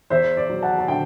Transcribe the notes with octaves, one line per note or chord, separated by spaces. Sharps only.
E2 C5 E5
D5
F#3
F#5 A5
A5
D3 E5 G5